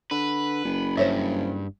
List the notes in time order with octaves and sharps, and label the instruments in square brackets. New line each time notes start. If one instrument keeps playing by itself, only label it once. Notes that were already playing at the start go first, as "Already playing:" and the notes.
[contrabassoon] D3 [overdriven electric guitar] B4
[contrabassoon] F#1
[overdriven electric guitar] G2 [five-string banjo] C5 C#5 E5